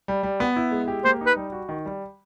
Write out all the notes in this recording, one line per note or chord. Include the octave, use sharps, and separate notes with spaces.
G3
G3
B3
E4
G#3
G4
A#3 C5
D#4
B4
G3
F#4
D#3
G3